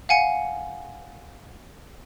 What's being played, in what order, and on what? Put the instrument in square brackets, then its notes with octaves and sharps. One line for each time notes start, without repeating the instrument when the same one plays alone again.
[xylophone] F5 F#5 G#5 C#7